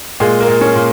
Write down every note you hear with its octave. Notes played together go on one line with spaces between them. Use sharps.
A#2 G#3 G#4
A#3 A#4
A#2
C#4
A#2